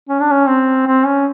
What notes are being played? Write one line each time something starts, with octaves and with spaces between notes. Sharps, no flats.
C#4
D4
C#4
C4
C4
C#4